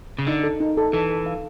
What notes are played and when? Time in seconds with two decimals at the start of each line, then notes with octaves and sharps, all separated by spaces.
0.19 C#3
0.27 D3 D#4
0.43 A4
0.60 D#4
0.77 A4
0.93 E3 A4
1.10 A4
1.26 F5